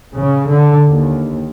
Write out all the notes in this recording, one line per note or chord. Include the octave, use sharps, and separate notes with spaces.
C#3
D3
D#2